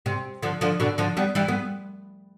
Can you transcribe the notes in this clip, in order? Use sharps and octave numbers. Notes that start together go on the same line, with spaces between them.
C3
D3 F3
D3 F3
B2 D3
D3 F3
G3 B3
E3 G3
B3